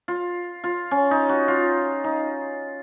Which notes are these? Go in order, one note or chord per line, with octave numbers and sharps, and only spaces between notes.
F4
F4
C#4
D#4
F#4
F4
D#4